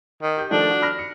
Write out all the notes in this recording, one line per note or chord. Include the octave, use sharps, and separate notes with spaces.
D#3
G4 G6
D#3 F3 A3 D4
F#4
B5 F6 A#6
C#7